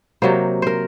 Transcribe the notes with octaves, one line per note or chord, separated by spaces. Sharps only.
C3 F#3 A#3 C5
A#4 C5